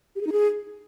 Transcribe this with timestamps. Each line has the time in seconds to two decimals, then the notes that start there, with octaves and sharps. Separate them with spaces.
0.16 G4
0.21 G#4
0.27 D#4
0.32 G#4